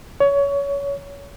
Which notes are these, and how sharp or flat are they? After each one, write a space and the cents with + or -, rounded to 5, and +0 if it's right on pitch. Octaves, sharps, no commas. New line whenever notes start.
C#5 +25